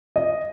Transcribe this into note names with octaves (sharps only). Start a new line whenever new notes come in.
D#5